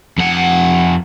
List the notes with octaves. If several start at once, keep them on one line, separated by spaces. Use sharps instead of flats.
F2 F#5